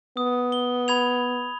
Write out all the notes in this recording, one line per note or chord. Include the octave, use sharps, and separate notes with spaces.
B3 D#6
G7
B5 G#6 F7